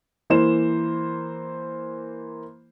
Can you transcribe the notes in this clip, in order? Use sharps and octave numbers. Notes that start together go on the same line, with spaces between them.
E3 A#3 C5 E7